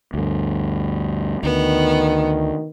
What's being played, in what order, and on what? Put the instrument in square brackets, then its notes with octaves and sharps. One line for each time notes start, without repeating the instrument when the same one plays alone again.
[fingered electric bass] D2 G2
[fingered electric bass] D2 [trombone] D#3 [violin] B3